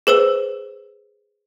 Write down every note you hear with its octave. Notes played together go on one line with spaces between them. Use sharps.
G#4 B4 C5 E6